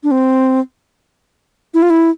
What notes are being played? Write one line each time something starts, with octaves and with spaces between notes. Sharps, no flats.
D4
C4
E4
F4
E4